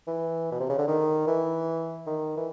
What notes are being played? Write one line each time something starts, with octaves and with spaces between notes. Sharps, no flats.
E3
B2
C3
C#3
D3
D#3
E3
D#3
E3